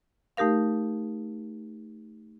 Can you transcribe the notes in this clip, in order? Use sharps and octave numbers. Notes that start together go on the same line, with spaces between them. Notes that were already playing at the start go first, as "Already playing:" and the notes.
A3 D#4 G4 A#4 F5